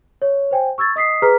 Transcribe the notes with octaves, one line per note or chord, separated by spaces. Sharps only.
C#5
C5 G5 G#5
C#6 E6 G#6 A6
D#5 D#6 B6 C7
G#4 B4 A#5 F6 B6